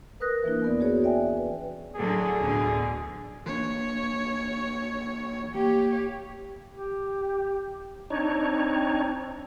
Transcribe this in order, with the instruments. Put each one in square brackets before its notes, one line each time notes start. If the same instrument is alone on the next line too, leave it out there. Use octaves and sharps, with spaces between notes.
[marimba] A#4 B4 D#6 F#6 A#6
E3 A#3 D4 E4
E2 B3 D5
C#4 F#4 G#4 C#5
D5 E5 G5 G#5
B4
[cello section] A2 D3 F#3 [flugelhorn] G#4
[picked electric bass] D1 [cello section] E2 B2 D3
[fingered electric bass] E3 A#3 D4 [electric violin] C#5
[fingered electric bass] A#3 [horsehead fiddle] G4 C#5
[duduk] G4
[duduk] C4 [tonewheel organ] D4 D#4 C#5